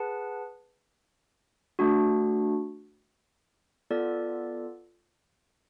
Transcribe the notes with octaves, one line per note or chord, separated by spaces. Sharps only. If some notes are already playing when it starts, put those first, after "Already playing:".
Already playing: G#4 B4 F#5 A5
A3 D4 F#4
B3 F4 A4 D5